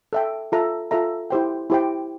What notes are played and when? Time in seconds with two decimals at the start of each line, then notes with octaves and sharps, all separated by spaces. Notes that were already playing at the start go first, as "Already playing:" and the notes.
0.13 A4 E5 G5
0.52 F4 A4 E5 A#5
0.91 F4 A4 E5 A#5
1.30 E4 G4 C5 G5
1.70 E4 G4 C5 G5